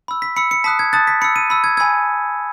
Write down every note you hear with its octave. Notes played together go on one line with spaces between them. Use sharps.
B5 E6
B6
B5 E6 C#7
C#7
A5 D#6 F#6 B6
G#6
A5 D#6 F#6 A6
B6
B5 E6 C#7
D#7
B5 E6
G#6
G#5 B5 E6 G#6